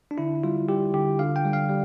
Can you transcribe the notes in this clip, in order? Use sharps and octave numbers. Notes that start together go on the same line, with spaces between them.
D4
D3 E4
G3 F4
G3 G4
D3 G4
D3 F5
G5
G3
F5
G3